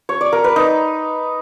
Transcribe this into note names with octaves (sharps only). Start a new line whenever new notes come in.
C#5
D5
A#4
B4
D#4